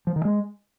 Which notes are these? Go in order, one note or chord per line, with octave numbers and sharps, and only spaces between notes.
F3
D#3
G#3